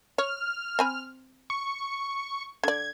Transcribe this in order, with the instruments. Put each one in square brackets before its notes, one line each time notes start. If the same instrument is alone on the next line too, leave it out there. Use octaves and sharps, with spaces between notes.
[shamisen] C#5 [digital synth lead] F6
[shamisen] C4 G#5 B5
[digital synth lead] C#6
[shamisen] D3 D5 [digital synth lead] G#6